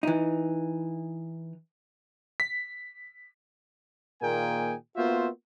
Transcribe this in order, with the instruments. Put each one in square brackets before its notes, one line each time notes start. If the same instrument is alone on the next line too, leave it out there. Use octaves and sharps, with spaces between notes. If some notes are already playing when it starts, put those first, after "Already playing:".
[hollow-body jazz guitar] E3 D#4
[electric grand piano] B6
[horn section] A#2 D#3 A#3 G#4 G5 G#5
A#3 B3 F4 F#4 C5 E5